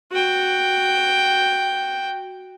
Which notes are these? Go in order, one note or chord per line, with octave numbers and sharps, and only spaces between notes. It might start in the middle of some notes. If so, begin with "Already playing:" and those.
F#4 G5